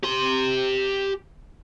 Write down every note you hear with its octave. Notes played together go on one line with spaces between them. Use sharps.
G4 C6